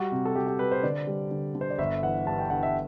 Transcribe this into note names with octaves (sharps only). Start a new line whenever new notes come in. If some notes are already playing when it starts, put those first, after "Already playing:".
Already playing: G3 F#4
C3
A4
G3 G4
G4
G3 B4
C5
D3 D5
G3
D3
D3
C5
D5
G1 E5
E3 F#5
G2 A5
G5
G1 F#5
E5